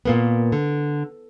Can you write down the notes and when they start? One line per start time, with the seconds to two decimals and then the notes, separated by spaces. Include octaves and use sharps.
0.05 A#2 A#3 B3
0.52 D3